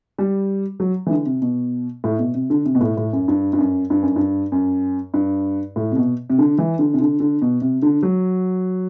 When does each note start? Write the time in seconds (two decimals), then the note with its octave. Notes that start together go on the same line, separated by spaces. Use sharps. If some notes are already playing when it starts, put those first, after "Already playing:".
0.18 G3
0.80 F#3
1.06 E3
1.10 D3
1.26 C3
1.42 B2
2.04 A2
2.19 B2
2.34 C3
2.50 D3
2.66 C3
2.75 B2
2.81 A2
2.97 A2
3.13 F#2
3.28 G2
3.53 G2
3.58 F#2
3.90 G2
4.03 F#2
4.16 G2
4.52 F#2
5.14 G2
5.76 A2
5.92 C3
5.97 B2
6.30 C3
6.38 D3
6.58 E3
6.79 D3
6.94 C3
7.00 D3
7.20 D3
7.42 B2
7.61 C3
7.82 D3
8.03 F#3